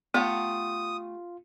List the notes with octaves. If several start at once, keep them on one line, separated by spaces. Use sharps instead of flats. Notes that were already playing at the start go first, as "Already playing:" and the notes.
A3 B3 F4 G4 F#5 D#6